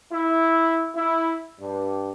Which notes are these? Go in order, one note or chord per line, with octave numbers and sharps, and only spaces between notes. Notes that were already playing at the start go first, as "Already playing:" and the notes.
E4
E4
G2